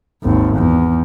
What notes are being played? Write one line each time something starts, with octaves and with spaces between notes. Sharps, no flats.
G#1 D#2
E2